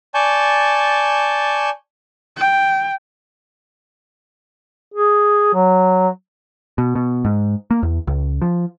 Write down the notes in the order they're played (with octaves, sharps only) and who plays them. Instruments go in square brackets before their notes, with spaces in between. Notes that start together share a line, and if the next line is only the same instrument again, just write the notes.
[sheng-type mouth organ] D5 G#5 A5 C#6 G6
[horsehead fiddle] G5
[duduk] G#4
F#3
[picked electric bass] B2
B2
G#2
A#3
E2
C#2
F3